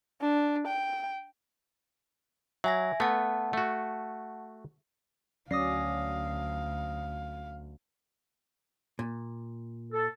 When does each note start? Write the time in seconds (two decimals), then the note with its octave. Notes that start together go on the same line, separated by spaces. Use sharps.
0.21 D4
0.67 G5
2.64 F#3 E5 G#5 A#6
3.00 A3 B3 F#5 A5
3.53 A3 F#4
5.51 D2 F#3 C#4 D5 F5 D#6 A#6 C7
8.99 A#2
9.93 A4